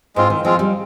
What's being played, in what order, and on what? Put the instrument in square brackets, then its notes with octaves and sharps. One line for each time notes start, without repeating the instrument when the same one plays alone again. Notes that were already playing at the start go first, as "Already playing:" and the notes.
[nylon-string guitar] G#2 [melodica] G#3 C4 F4
[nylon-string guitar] D#3
[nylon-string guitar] F3 [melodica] G#3 C4 F4
[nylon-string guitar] G3